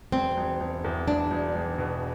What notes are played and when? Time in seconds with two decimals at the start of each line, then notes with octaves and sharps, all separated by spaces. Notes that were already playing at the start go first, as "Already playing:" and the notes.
0.12 E1 C4
0.37 E1
0.60 E1
0.84 E2
1.08 E1 D4
1.31 E1
1.55 E1
1.78 B2